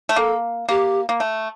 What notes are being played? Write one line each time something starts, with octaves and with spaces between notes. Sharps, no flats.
A3
A#3 A4
A#3 G4
A#3
A3